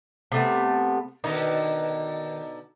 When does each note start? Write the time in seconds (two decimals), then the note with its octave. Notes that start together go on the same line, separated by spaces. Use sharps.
0.32 C3 A3 B3
1.24 B2 D3 D#3 D#4